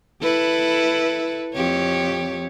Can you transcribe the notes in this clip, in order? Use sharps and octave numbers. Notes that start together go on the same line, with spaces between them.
E4 A4 B4
F2 G4 C#5